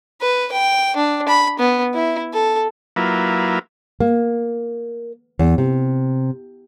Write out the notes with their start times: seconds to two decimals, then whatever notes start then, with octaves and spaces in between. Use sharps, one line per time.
0.21 B4
0.52 G5
0.96 D4
1.28 B5
1.59 B3
1.94 E4
2.33 A4
2.96 F#3 A#3 E4 F4 B4
4.00 A#3
5.39 E2
5.58 C3